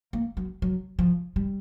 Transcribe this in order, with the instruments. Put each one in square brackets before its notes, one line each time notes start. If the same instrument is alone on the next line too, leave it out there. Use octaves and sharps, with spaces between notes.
[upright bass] A#3
F#3
F#3
F3
G3